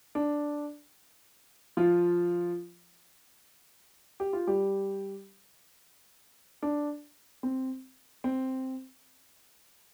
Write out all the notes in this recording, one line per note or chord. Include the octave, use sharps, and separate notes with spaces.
D4
F3 F4
G4
F4
G3 G4
D4
C4
C4